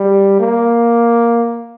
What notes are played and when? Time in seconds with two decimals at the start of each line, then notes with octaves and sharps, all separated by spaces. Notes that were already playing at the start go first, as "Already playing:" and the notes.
Already playing: G3
0.40 A#3